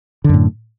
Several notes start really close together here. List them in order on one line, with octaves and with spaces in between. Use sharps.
D3 F#2 A2